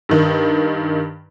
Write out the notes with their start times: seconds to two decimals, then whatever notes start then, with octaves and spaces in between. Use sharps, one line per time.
0.09 G2 D#3